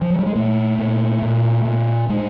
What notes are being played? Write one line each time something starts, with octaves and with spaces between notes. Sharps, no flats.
F3
F#3
G3
G#3
A#2 A3
A#2
A#2
A#2
A2 G#3